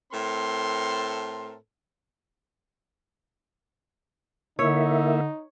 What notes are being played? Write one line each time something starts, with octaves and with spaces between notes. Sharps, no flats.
A2 C4 A4 A#4 C6
D3 A#3 D#4 E4 C#5 E5